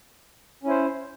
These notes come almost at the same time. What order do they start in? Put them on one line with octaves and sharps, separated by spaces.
C#4 E4 C5